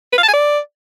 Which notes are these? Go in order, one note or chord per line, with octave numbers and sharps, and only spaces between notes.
B4
F5
A5
G#5
D5